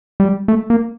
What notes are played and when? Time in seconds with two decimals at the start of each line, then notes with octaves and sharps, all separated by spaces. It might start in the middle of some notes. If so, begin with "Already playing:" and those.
0.20 G3
0.48 A3
0.70 A#3